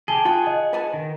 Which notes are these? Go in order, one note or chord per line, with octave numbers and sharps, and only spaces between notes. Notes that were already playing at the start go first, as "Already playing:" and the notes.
G4 G#4 G#5 A5 G7
F4 G#4 F#5 G5
D#5
B4 G#5 A5
D#3